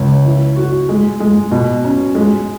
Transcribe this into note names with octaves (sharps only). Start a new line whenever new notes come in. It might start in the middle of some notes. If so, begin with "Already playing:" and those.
Already playing: C#2
E3
F#4
G#3
G#3
B2
C#4
G#3